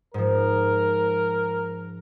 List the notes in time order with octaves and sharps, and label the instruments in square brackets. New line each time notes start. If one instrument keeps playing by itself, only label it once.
[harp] G#2 F3 [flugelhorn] A#4